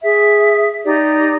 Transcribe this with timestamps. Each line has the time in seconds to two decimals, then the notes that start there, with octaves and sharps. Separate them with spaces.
0.03 G#4 E5
0.84 D#4 G4 D5